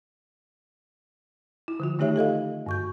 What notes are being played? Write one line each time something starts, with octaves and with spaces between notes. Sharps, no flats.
E4
D3 F3 F4
D#3 A3 D#4 G4 C#5 E5
G4 A4 D#5 F5
G2 C#6 G6